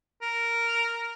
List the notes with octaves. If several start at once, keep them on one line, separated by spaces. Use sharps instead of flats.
A#4